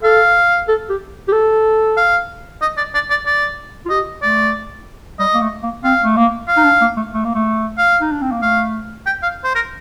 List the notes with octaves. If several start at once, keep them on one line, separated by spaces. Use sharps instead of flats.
A4 F5
A4
G4
G4
A4
F5
D#5
D5
D5
D5
D5
F4
G4 D#5
A3 D5
G3 D#5
A#3
A3
A#3
C4 F5
A3
A#3
F5
D#4
D4
A#3
A3
A3
A#3
A3
F5
D#4
D4
C4
A#3
A3 F5
G5
F5
C5
A#4